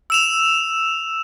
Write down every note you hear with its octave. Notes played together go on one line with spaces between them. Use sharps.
E6 E7 F7